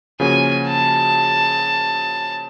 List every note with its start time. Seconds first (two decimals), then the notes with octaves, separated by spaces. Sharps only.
0.20 C#3 F3 A#3 C#4 F#4 G#5
0.67 A5